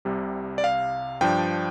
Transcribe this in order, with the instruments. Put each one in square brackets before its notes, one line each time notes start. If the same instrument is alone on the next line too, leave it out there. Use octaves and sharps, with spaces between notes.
[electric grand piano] C2 C3 G3
D5
F5
G2 F3 D4 G5